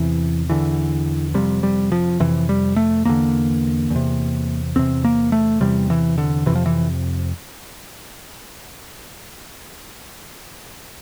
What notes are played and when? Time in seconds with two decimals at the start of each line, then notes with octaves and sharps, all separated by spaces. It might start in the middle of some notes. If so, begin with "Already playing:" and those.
Already playing: E2 C3 E3
0.50 E2 D3 E3
1.34 F2 C3 G3
1.63 G3
1.92 F3
2.20 F2 C3 E3
2.49 G3
2.76 A3
3.05 E2 D3 A#3
3.90 E2
3.96 C3
4.76 E2 C3 C4
5.04 A#3
5.32 A3
5.60 E2 C3 G3
5.90 E3
6.18 D3
6.46 F2 C3 E3
6.55 F3
6.66 E3